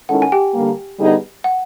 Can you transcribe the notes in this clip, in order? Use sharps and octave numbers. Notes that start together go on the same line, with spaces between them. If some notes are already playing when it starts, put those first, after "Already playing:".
D#3 G#3 C#4 E4 A4 F#5
G#5
G4 G5
D3 G3 A#3
D3 G3 B3 D#4 G#4
F#5